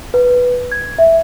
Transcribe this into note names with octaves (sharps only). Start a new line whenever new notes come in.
B4
G#6
E5